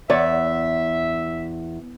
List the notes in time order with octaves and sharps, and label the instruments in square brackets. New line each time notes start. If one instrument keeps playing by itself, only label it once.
[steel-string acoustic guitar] E2 [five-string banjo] C#5 D5 F#5 [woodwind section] E5